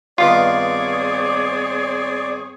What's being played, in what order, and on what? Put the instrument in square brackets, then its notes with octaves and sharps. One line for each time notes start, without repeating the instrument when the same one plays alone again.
[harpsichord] G2 D#3 B3 [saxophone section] C4 G#4 C#5 [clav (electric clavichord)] F4 [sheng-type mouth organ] D5